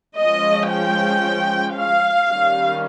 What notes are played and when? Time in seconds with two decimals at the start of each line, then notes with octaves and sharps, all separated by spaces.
0.17 F3 G#3 C#4 D#5
0.71 G5
1.76 F5
2.28 D#3 G3 C#4